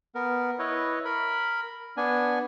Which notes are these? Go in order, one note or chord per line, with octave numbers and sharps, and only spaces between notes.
B3 A#4
E4 B4 C#5 D#5
A#4 B5
B3 D4 G#5